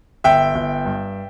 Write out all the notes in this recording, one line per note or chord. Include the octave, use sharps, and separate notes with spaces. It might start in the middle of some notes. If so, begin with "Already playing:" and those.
G1 E5 G5
G1
G2